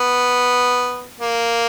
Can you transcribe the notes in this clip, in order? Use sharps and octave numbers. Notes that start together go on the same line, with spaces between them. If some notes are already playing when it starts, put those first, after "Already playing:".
Already playing: B3
A#3